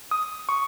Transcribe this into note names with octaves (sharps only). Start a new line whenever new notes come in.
D#6
C#6